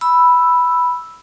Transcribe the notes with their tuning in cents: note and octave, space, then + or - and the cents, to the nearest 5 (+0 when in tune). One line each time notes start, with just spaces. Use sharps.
B5 +0 E6 +0